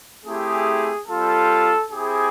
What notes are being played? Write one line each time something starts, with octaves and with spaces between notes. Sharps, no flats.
A3 C4 E4 G4 G#4
G3 C4 F4 A4
C4 E4 G4 G#4